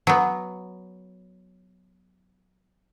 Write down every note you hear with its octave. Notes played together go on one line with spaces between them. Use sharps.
F#3 B3